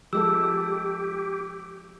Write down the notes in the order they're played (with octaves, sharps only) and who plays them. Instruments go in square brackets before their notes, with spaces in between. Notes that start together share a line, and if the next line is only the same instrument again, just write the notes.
[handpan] F3 G#3 A4 [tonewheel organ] G4 [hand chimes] E6